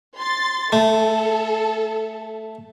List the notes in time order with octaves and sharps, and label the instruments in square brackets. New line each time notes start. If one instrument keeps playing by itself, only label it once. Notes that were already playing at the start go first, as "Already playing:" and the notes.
[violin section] C6 A6
[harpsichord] A3 [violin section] A4